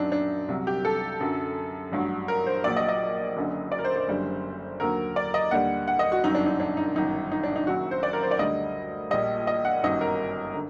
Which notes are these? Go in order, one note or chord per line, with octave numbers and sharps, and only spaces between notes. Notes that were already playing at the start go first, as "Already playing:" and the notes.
Already playing: F#2 F#3 D4 D#4
D4
C2 C3 F#3
G4
A4
F#2 D3 F#3
A1 G2 F#3
A#4
C5
A#1 A#2 F#3 D5
D#5
D#5
F#1 F#2 D3 F#3
D5
A#4
C5
C5
F#1 F#2 D3 G3
D#2 D3 F#3 A#4
D5
D#5
D#2 D3 G3 F#5
F#5
D#5
F#4
G1 F#2 F#3 D#4
D4
D#4
D4
D#4
G1 F#2 D#3 D#4
D#4
D4
D#4
F#1 F#2 D#3 F#3 F#4
C5
D5
A#4
C5
D5
D2 D3 G3 D#5
A#1 A#2 G3 D#5
D#5
F#5
G1 F#2 D#3 F#3 D#5
A#4
D3